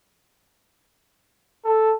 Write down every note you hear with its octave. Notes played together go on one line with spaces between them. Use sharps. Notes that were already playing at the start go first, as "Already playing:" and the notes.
A4